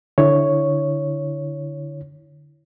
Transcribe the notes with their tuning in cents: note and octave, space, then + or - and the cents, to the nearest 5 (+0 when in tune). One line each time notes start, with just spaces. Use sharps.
D3 +0 E4 +0 C#5 +0